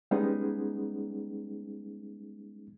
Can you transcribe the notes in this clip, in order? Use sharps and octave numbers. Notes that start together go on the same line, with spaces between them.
G3 G#3 B3 C#4 D#4 G#4